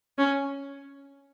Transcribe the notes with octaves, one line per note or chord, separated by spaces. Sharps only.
C#4